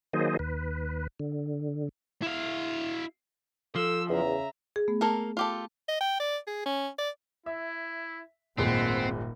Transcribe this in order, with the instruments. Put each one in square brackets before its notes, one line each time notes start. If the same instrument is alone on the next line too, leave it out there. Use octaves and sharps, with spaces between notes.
[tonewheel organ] D#3 F#3 A#3 G#4 C5 D#5
D#2 B4
D3
[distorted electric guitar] E4 F5
[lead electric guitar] F3 [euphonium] A4 [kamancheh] E6
[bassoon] E2 [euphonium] C#3 [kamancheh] E5 A#5
[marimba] G#4
A3 B3
[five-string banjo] A#3 A4 A#4
F4 G4 A4
[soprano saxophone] D#5
G5
D5
G#4
C#4
D5
[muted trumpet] E4 [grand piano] E5
[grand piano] D#1 G#1 G#3 [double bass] A#2 [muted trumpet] B3 [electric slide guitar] C4